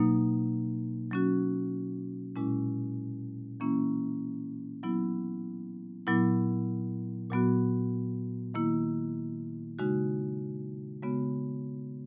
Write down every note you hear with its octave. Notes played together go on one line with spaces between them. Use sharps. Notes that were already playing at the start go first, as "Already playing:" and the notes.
Already playing: B2 F#3 A#3 D#4
F#3 C#4 F#4
A#2 G#3 C#4 E4
E3 A#3 C#4 E4
F#3 B3 E4
A#2 F#3 B3 E4
A#2 F#3 B3 F#4
D#3 A#3 E4
C#3 G#3 D#4 F#4
C#3 G#3 B3 F#4